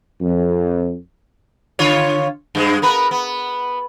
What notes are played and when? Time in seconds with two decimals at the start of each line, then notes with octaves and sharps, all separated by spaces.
0.20 F2
1.79 D3 F4 C#5
2.55 G2 G#3
2.82 B3 A#4 B4
3.11 B3